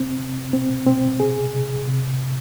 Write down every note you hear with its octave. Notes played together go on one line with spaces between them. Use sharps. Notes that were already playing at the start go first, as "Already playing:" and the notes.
Already playing: C3 C4
C3
B2 C4
B2 C4
C3 G#4
C3
C3
C3